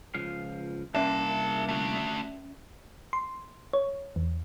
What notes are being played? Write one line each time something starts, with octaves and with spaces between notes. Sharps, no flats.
C#2 F3 F5
C2 A#3 C#4 D4 A#4 D5 E5 A5
A3 F#4
C6
C#5
E2